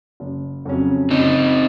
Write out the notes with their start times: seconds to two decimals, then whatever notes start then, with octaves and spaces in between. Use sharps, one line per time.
0.20 F#1
0.65 F2 C#3 F#3 C#4
1.11 F#1 C4 D#4